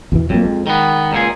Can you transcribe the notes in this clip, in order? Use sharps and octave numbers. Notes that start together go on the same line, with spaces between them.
E2 B2 E3
F2 F#3 G3 A#3
G#3
D#3 B3
C#2 A#2 G#4